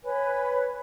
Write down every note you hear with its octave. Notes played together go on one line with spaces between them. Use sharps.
B4 C#5 G#5 B5